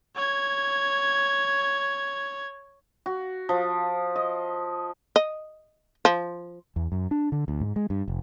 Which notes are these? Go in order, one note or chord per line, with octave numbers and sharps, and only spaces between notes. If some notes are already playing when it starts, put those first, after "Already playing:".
C#5 G#6
F#4
F3
D#5
D#5
F3
E2
F#2
D4
D3
D2
G#2
G#3
G2
F1